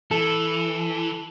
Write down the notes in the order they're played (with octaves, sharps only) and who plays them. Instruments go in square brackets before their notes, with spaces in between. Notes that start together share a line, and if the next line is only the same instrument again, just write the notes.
[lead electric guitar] E3 [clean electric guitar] A4